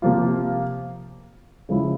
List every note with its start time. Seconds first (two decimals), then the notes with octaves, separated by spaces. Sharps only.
0.02 C3 F3 A#3 F4
1.69 C#3 F3 G#3 E4